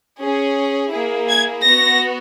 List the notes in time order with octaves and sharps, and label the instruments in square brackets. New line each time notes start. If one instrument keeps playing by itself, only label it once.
[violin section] C#4 G#4
A#3 E4 G#4
G#6
B3 F#4 A#6